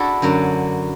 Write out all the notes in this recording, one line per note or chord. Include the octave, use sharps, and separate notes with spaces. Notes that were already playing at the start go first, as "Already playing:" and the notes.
Already playing: D4 E4 F#4 A4
F#2 D3 F#3